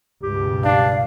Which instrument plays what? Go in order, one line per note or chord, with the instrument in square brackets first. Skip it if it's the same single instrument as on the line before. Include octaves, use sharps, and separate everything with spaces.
[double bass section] C#2 G2 B2 [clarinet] G4
[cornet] D4 [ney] F5